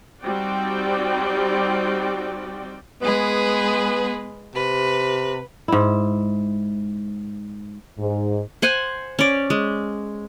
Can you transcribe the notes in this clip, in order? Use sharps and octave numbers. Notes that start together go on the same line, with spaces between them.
G3 C4 D#4 F#4 D5 G5
G#3 B3 G#4 B4
C3 B4
G#2 E4
G#2
C5 F#5 G#5
C#4 D5
G#3